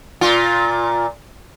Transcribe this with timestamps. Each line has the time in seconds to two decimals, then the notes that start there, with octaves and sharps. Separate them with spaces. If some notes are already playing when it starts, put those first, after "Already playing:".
0.21 A#2 F4